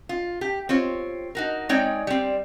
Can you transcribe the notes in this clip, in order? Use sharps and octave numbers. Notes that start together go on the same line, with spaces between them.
F4
G4
C4 F4 C#5
D#4 F#4 A#4
G#3 C4 D#4 C#5 D5 G5
G3 C4